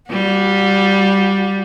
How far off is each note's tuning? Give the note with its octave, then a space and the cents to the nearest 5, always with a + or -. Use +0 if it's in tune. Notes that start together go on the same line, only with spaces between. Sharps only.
G3 +0 F#4 -35